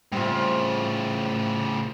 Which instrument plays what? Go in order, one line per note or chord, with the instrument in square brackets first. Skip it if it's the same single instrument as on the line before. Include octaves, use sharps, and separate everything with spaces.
[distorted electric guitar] A2 C#3 [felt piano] G3 [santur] C4 F4